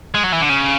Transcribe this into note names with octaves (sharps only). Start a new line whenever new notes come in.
G#3
F#3
E3
D3
C#3